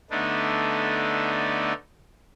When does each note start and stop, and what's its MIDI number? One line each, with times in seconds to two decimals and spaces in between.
0.10 1.73 50
0.10 1.73 57
0.10 1.73 59
0.10 1.73 62
0.10 1.73 63